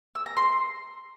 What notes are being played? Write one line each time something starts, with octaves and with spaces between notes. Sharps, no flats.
E6
A#5
C6